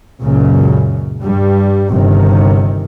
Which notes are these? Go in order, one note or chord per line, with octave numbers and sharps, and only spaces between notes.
C#2 F#2 A#2 C#3
G2 G3
G1 C3 D#3